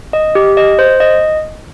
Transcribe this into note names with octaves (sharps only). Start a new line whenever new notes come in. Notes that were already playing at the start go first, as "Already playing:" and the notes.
D#5
G4
D#5
C5
D#5